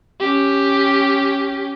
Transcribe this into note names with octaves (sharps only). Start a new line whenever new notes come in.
C#4 G4